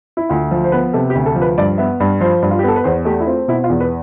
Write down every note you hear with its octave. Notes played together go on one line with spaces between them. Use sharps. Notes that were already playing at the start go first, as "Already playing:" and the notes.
E4
D2 F4
F3
C5
B3 B4
C3 A4
G4
D2
A4
F3
B4
G2 D5
B3 E5
G2
F3 C5
G2
F4
G4
B3 A4
B4
E2 C5
A3 G4
E4
C4 F4
B2 E4
F4
E2
B4